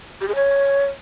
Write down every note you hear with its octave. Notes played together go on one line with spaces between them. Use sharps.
G4
G#4
C#5